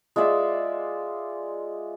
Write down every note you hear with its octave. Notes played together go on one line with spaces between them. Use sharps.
G#3 F4 D5 E5